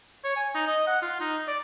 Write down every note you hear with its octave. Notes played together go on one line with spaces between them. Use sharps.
C#5
G#5
D#4
D#5
F#5
F4
D#4
D5